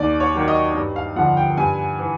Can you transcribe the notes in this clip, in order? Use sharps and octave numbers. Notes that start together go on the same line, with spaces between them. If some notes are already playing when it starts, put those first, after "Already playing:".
Already playing: D#2 D5
C#5
D#3 F#3
D#5
G2
F5
D3 F3 F#5
G5
G2 G#5
E3